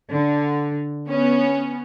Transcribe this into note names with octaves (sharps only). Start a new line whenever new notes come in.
D3
B3 C#4